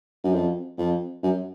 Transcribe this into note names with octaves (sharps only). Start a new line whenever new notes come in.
F#2
F2
F2
F#2